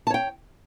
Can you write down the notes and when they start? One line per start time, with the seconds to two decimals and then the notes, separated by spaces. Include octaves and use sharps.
0.07 A5
0.10 C#5
0.14 G5